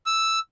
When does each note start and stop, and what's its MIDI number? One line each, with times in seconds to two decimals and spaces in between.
0.06 0.39 88